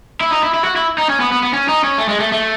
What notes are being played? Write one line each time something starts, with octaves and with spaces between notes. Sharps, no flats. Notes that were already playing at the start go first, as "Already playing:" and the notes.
E4
D#4
E4
E4
F#4
E4
D#4
C#4
B3
B3
B3
C#4
D#4
C#4
A3
G#3
A3
A3